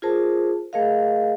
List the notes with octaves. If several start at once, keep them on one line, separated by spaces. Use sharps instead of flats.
F4 G#4 A#4 C5 A5
A3 G#4 A#4 D#5 F5